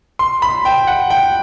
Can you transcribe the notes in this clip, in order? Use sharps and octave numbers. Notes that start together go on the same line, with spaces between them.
C6
B5
G5
F#5
G5